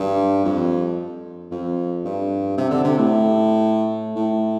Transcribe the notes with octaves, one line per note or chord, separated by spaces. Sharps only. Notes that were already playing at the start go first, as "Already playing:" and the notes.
Already playing: G2
F2
F2
G2
C3
D3
C3
A2
A2